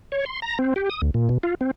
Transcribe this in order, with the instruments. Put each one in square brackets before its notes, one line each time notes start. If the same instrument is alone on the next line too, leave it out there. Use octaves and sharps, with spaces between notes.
[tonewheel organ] C#5
C6
A#5
C4
G4
D#6
D2
A#2
B2
F4
C4